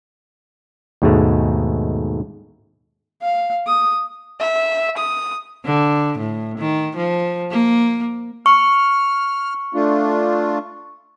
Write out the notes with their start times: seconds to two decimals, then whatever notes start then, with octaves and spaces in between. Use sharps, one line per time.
1.02 D#2 G#2 B2 G#3 A3
3.22 F5
3.67 D#6
4.40 E5
4.97 D#6
5.65 D3
6.19 A2
6.58 D#3
6.97 F3
7.51 A#3
8.46 C#6 F6
9.75 A3 D4 F4